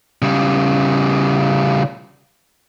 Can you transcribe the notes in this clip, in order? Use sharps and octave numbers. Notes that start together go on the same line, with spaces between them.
C#3 G3